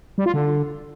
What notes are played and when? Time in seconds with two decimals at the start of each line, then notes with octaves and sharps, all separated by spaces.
0.18 G3
0.26 F4
0.34 D3